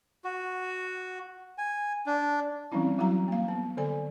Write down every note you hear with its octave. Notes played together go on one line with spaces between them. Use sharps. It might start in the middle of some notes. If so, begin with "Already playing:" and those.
F#4
G#5
D4
E3 G3 C4 C#4 E4
F#3 E4 F#4 F#5 A#5
A#3 F5
B3
D3 A4 D5 G#5